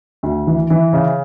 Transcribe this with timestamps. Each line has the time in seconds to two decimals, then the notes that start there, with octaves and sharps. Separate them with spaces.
0.23 D2
0.47 E3
0.70 E3
0.93 C#3